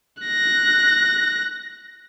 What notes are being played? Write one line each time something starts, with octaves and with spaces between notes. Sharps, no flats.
F#6 A#6